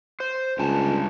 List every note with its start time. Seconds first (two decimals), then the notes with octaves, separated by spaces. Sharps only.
0.20 C5
0.58 C#2 G2 G#5 A5